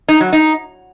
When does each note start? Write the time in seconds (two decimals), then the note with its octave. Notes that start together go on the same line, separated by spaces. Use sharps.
0.08 D#4
0.20 F#3
0.32 D#4